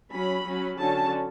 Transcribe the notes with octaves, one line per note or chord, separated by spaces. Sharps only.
F#3 C#4 B5
F#3 C#4
D3 F#3 C#4 A5